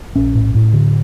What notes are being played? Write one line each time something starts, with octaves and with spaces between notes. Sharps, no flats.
A#1 C#4
A2
A2
D3